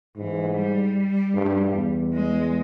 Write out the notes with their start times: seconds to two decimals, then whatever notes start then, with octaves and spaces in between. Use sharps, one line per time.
0.17 G#2 E3
0.57 G3
1.34 G2
1.74 E2
2.13 G#3